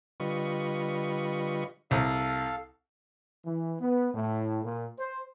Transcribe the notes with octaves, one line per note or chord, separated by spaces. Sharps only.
D3 G3 F4 B4 D#5 C#6
C2 A4 F5
E3
B3
A2
A#2
C5